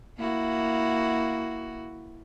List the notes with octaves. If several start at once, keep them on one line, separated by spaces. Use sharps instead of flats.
A#3 E4 F#4